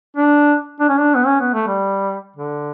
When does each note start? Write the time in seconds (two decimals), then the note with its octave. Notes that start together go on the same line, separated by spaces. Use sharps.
0.16 D4
0.80 D4
0.89 C#4
0.98 D4
1.15 B3
1.26 C#4
1.40 B3
1.54 A3
1.67 G3
2.36 D3